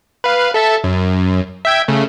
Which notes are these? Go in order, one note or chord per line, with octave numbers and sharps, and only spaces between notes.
B4 F5
A4 E5 A5
F#2
E5 G5 G#6
C#3 A3